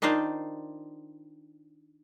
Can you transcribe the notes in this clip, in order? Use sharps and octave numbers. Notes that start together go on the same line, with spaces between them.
D#3 D4 D#4 F4 C5 D5